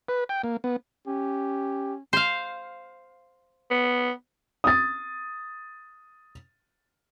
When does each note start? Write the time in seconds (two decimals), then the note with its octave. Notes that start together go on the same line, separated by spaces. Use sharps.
0.09 B4
0.29 G5
0.44 A#3
0.64 B3
1.07 C#4 G4
2.13 C5 F5
3.71 B3
4.64 D#6 A6